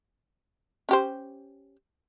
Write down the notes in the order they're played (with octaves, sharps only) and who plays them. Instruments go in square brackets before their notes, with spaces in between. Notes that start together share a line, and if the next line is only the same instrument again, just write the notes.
[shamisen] C#4 G4 C5